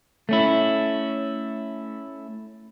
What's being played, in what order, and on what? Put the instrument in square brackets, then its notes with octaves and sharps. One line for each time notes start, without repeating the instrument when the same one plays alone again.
[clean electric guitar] A3 C#4 E4